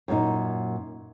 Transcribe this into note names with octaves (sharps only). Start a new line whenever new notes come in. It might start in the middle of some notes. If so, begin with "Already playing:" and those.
F#2 A#2 D#4